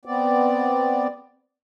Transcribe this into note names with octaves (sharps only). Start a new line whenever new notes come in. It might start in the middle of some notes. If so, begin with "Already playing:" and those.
B3 C4 D5